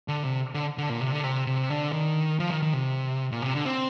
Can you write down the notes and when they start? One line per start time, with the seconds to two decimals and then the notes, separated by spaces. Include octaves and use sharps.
0.08 D3
0.24 C3
0.54 D3
0.78 D3
0.90 A#2
1.01 C3
1.12 D3
1.24 C3
1.47 C3
1.70 D3
1.93 D#3
2.40 F3
2.50 D#3
2.62 D#3
2.73 C3
3.32 A#2
3.42 C3
3.54 D3
3.65 C4